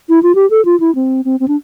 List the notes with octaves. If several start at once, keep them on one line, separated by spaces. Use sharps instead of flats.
E4
F4
G4
A4
F4
E4
C4
C4
C4
D4